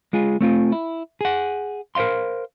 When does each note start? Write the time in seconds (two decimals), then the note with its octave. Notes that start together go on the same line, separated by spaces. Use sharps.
0.13 G#3 F4 G#4
0.41 A3 C4 F4
0.72 E4
1.21 G#4 F#5
1.95 A#4 C5 D#5 F5 C6